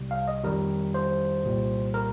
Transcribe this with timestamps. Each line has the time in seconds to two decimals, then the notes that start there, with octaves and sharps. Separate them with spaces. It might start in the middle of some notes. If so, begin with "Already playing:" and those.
Already playing: C2 C3 G3
0.11 F5
0.28 D#5
0.44 F2 D#3 G3 A#4
0.94 C5
1.44 C2 A#2 G3
1.94 A#4